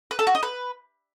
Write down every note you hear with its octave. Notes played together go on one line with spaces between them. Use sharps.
B4
A4
F#4
D#5
B4